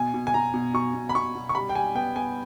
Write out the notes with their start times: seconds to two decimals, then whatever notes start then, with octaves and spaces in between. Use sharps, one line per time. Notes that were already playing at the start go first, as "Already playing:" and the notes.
Already playing: B2 G#5
0.14 B2
0.27 G#5
0.34 B2 A#5
0.54 B2
0.74 B2 C#6
0.94 B2
1.09 B5
1.15 B2 C#6
1.35 B2
1.49 C#6
1.54 G3 B5
1.69 G5
1.75 G3 G#5
1.95 B3 G5
2.16 B3 G#5